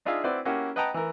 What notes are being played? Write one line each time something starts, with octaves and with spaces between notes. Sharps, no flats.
D4 D#4 F4 G#4 E5 F5
C4 E4 F#4 B4 C5 D5
A#3 C#4 E4 F#4 G4
B4 D#5 F#5 G5 A5 A#5
E3 A#4